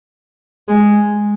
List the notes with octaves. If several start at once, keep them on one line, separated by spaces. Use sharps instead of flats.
G#3